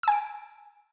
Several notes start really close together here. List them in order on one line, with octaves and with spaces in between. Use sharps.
E6 G#5 D7